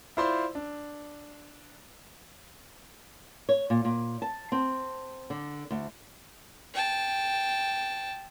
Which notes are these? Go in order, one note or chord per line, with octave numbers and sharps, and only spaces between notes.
E4 F4 C5 D5 B5 C6
D4
C#5
A#2
A#2
A5
C4
D3
D2
G5 A5